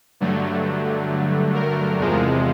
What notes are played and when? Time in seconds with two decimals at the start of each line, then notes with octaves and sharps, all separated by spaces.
0.20 G2 D3 F#3 A3
1.54 A#4
1.99 E2 C3 F3 G#3